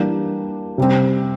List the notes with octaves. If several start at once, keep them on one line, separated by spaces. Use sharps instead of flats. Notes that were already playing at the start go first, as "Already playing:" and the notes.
Already playing: E3 G3 A#3 D4
C3 G3 C4